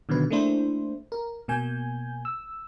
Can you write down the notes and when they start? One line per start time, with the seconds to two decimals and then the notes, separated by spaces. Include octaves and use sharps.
0.09 B2 D3 D#3 F#3 B4
0.31 A3 A#3 D4 E4 C5
1.12 A#4
1.48 B2 A#3 G#5 G6
2.25 E6